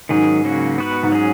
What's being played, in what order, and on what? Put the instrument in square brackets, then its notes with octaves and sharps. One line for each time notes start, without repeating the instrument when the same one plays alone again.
[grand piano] G#2 [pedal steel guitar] D#3 F#3 C#4 G#4
[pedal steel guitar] C#3 F#3 A#3 C#4 F#4
B3 F#4 B4
[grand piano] G#2
[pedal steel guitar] F#3 C#4 G#4